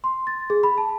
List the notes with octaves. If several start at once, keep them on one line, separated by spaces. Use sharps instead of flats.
C6
A6
G#4
B5
A5